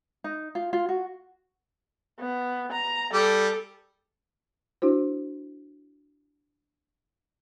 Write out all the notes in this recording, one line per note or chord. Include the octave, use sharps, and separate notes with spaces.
D#4
F4
F4
F#4
B3
A#5
G3 A4
D4 E4 F#4 C5